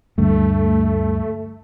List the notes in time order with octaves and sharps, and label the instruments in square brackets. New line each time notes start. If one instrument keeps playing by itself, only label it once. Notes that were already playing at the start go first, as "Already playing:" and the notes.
[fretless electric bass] D2 G2 [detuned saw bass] A3